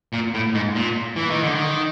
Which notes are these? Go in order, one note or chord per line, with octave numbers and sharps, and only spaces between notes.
A#2
A2
G#2
A#2
E3
D#3
D3
D#3